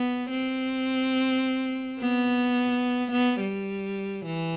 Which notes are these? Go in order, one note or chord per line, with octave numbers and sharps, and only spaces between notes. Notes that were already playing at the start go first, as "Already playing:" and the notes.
Already playing: B3
C4
B3
B3
G3
E3